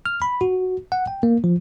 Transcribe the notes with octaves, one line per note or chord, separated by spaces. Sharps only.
F6
B5
F#4
F#5
G5
A#3
F3